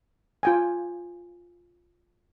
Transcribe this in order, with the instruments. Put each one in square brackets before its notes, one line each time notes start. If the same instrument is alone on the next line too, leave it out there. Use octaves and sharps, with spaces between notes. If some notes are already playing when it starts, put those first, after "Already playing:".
[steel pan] F4 G5 G#5